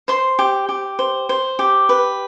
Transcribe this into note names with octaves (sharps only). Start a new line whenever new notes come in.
C5 C6
G4
G4
C5
C5
G4
B4